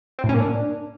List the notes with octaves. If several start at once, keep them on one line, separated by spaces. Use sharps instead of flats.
C4
A2
C#4
A#3
D4